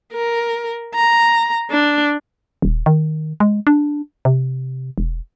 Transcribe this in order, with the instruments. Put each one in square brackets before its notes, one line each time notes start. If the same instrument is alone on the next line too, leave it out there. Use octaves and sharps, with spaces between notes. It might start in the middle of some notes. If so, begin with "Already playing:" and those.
[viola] A#4
A#5
D4
[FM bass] D#1
D#3
G#3
D4
C3
E1